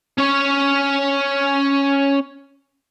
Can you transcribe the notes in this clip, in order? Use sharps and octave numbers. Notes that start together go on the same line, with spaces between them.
C#4 C#5